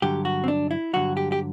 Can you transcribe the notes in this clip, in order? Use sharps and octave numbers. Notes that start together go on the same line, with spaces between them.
G2 D3 F#3 G4
F#4
C4
D4
E4
G2 D3 F#3 F#4
G4
G4